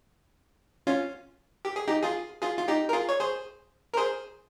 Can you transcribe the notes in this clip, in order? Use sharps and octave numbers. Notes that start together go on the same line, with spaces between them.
C#4 F4
G4
G#4
D#4 G4
F4 G#4
F4 G#4
F4
D#4 G4
A#4
F4 G#4
C#5
G#4 C5
A#4
G#4 C5